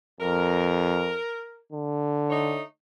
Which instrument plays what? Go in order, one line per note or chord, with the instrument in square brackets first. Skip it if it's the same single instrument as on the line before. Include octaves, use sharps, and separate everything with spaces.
[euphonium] F2 [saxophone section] A#4
[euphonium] D3
[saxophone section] A3 D#4 C#5